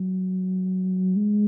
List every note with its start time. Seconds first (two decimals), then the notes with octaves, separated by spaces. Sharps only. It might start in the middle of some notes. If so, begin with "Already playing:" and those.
Already playing: F#3
1.16 G#3